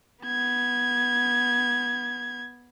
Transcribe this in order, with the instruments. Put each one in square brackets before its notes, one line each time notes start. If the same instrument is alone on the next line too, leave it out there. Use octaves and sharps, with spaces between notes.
[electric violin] B3 G#6